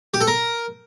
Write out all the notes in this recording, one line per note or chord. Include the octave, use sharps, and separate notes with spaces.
G4
A4
A#4